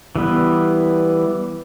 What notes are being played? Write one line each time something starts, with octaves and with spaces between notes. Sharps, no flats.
E3 G3 B3